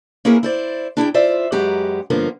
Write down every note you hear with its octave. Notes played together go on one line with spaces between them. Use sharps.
A#3 C#4 E4 G#4 A#4 B4
E4 C5 D5
D4 E4 G#4 G5
F4 C5 D5 E5
F#2 G#3 G4 B4 F#5 A#5
G2 D3 F3 A#3 B3